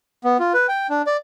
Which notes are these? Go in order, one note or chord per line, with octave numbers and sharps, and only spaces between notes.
B3
F4
B4
G5
D4
D5